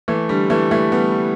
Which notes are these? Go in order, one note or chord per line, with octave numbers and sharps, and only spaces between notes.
E3 A3
D3 G3
E3 A3
E3 A3
G3 B3